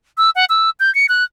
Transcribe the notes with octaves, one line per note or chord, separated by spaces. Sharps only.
E6
F#5
E6
G6
C#7
F#6